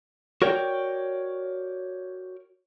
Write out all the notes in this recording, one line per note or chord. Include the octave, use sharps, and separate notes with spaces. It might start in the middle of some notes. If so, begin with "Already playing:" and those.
F#4 A#4 C#5 D5 G5